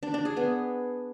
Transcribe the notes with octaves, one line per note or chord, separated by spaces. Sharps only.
D4
D4
G#4
B3